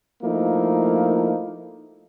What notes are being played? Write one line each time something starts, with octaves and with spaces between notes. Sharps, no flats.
F3 A3 A#3 D#4 E4